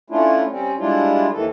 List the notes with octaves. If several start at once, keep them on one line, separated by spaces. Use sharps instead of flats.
A3 C#4 D4 E4 F4
G3 C4 C#4
G3 G#3 D4 E4 F4
D#2 D#3 E3 A4